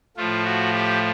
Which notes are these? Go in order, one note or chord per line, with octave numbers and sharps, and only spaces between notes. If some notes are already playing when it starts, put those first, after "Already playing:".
A2 F3 A3 F4
F#4
G4